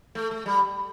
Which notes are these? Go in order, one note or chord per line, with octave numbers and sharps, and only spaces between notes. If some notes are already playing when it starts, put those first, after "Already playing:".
A3
A3
G3